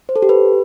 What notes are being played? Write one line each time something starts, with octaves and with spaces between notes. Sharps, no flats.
C5
A4
G4
B4